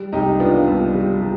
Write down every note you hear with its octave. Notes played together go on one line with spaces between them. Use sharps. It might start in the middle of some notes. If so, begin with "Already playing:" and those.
Already playing: G3
C2 D#4 G4
B3 D4 F4
C2
G3
G3